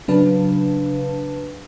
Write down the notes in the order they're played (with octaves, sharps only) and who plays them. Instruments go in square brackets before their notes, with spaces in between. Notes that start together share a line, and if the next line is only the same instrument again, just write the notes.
[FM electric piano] C#3 F#3 D4 B4 F5 A5